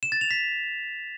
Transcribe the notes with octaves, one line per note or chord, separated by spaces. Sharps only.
E7
A6
F7
B6